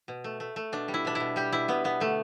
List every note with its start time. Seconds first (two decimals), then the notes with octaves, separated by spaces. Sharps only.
0.08 B2
0.24 A3
0.40 A3
0.56 A3
0.72 B2 D4
0.88 G3
0.94 E4
1.05 B2 D4
1.15 E4
1.20 B2
1.36 G3 G4
1.52 B2 E4
1.68 B2 B3
1.84 B2 B3
2.00 D3 A3